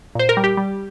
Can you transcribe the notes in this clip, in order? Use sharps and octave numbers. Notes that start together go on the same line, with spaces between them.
A#2 C5
A#4
G3
G4
G3